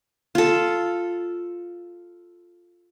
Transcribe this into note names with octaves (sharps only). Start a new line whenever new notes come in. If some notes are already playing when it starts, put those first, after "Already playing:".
F4 A4